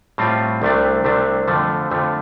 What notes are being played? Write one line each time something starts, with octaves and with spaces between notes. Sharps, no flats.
A2 G3 C4 F4
C2 C3 A3 D4
C2 C3 A3 D4
F2 D3 F3 A3
F2 D3 F3 A3